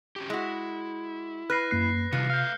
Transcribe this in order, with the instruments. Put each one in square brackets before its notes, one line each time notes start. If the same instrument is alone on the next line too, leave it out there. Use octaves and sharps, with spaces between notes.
[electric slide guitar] C#4 F#4 G4
[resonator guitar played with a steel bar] G#3 F#4 [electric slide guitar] E4
[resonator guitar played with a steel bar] B4 [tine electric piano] F6 [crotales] F#6 A#6 C7
[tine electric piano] F#2 A#3 C7 [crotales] F#6
[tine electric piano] C3 [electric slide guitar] D#3 E3 G3 [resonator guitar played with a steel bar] F4 [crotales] F#6 C#7
[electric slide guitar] A3 F5 [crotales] F6 G6